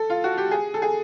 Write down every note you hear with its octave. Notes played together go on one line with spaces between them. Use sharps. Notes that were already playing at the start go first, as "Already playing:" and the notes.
Already playing: A4
F4
F#4
G4
G#4
A4
G#4